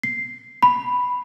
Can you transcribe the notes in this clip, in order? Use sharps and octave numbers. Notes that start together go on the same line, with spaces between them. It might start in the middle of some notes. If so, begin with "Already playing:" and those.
C7
B5